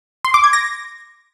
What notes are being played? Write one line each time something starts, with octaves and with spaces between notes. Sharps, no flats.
C6
D6
G#6
A#6